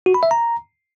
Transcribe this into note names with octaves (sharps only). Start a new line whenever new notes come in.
F#4
B5
E5
A#5